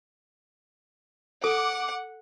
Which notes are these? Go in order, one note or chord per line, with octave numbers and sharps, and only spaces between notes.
A4 F#5 D6